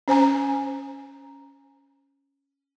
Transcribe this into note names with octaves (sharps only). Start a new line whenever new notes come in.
C#4 C5 G#5 A#5